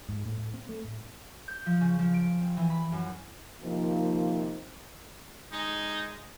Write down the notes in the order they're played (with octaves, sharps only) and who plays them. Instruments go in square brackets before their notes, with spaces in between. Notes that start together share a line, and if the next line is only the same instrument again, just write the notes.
[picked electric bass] G#2
A2
A2
C4
A3
A2
[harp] G6
F3
C#3
F3
D7
C4
E3
B5
F#2
[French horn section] C3 D#3 F3 A#3 D#4
[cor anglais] G#3 [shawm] D#4